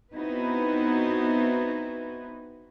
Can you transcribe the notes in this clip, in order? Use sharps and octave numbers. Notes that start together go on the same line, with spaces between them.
B3 C4 D#4 E4 F#4 B4